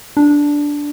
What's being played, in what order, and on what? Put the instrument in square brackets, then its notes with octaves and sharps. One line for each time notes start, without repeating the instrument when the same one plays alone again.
[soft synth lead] D4